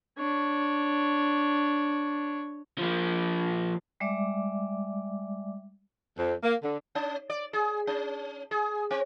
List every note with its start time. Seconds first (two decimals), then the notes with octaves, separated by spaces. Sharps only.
0.19 D4 C#5
2.78 F3 A#3
4.00 G3 G#3 D5 E5 D6
6.17 F2
6.42 A#3
6.63 D3
6.95 C#4
7.30 D5
7.53 G#4
7.87 C#4
8.51 G#4
8.91 C4